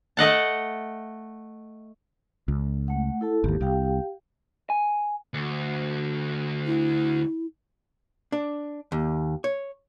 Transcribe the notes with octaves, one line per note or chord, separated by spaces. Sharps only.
A3 D#5 F#5 A5
C#2
A3 F#5
E4 A4 A5
G#1 D#2 G4
C2 G4 F5 G5
G#5
D2
E4
D4
D#2
C#5